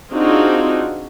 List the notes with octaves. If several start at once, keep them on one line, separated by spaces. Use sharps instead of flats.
C4 D4 D#4 F4 F#4 G#4